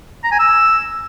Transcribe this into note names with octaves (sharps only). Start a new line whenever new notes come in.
A#5
G#5
E6